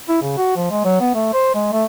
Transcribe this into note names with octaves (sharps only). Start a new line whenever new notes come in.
E4
C#3
F#4
F3
G#3
F#3
B3
A3
C5
G#3
A3